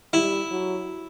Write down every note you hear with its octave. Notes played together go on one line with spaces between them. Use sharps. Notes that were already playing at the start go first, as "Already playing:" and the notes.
G3 E4
F#3